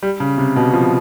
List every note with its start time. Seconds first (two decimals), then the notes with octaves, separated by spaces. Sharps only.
0.03 G3
0.20 C#3
0.38 C3
0.56 B2
0.73 F3